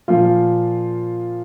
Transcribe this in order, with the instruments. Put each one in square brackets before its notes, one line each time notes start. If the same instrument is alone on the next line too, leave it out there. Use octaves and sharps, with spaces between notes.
[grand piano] A#2 F3 F4